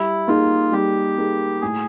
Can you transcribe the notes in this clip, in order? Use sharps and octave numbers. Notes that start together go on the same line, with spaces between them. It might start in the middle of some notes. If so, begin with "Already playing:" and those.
Already playing: G3 E4
A#3 D#4 F4 G#4
G3 G4
A#3 D#4 G#4
A2 G#4